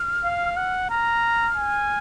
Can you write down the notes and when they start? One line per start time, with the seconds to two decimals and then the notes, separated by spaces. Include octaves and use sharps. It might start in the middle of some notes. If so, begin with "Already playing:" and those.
Already playing: F6
0.24 F5
0.57 F#5
0.90 A#5 F6
1.56 G#5